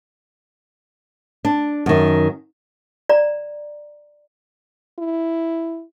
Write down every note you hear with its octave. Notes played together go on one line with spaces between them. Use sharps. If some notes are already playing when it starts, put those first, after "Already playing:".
D4
F#2 D#3
D5 A#5
E4